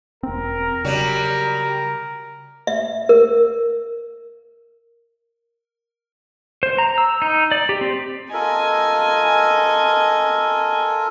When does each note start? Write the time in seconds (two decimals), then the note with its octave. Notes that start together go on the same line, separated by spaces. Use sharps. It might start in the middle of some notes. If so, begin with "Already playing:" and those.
0.23 E1 C4 A#4
0.85 C#3 F#3 G3
2.67 E5
3.09 A#4
6.63 C5
6.78 A#5
6.98 E6
7.22 D#4
7.52 D5
7.69 G4
7.81 C4
8.33 F4 A4 A#4 D#5 G#5